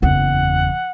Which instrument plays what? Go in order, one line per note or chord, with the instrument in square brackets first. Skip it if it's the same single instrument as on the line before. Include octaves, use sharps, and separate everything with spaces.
[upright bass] F#1 E2 [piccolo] F#5